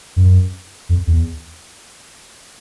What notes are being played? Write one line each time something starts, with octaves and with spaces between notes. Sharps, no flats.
F#2
F2
E2